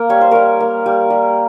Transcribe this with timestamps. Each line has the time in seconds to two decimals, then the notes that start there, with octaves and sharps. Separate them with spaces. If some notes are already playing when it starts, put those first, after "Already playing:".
Already playing: A#3 A#4
0.09 G3 C#5
0.21 C5
0.31 G3 A#4 C#5
0.60 A#3
0.86 G3
1.10 G3